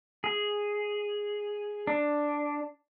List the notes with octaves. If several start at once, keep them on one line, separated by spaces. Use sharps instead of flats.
G#4
D4